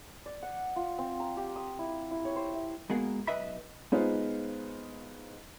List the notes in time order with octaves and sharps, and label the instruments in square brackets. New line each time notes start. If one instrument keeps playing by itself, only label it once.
[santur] D5
F#5
F4
C4
A#5
G4
D#6
E4
E4
C#5
C5
E5
[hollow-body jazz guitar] G#3 A#3 B3 F#4 G#4 A#4
B1 E2 B4 D#5 E5 B5
[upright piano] G#3 B3 D#4 F4 C5